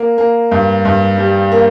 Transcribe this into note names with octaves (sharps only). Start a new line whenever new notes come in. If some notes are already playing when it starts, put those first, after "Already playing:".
Already playing: A#3
A#3
G2
G2
G3
A#3